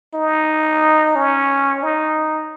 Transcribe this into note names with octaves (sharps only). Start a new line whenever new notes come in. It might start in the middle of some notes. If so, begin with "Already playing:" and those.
D#4
C#4
D#4